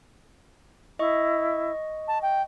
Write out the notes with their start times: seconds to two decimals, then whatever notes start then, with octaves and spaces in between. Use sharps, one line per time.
0.99 E4 D#5 C#6
2.08 A5
2.22 G5